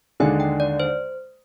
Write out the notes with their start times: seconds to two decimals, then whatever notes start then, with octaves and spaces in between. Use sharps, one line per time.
0.20 D#2 D3 G#3 D4 G#4 G#5
0.40 G5
0.60 D5
0.80 C5